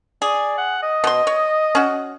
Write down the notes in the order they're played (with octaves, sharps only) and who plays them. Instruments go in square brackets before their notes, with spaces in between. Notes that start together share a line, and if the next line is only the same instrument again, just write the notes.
[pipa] G#4 [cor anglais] D5
[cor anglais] F#5
D#5
[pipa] B2 C6
C#5
C#4 F#4